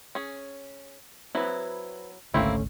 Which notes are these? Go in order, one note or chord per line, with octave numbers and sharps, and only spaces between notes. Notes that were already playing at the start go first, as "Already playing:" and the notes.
C#4 G#4
F#3 C4 E4 B4
G#1 C#2 D3 A3 A#3 C4 C#4 E4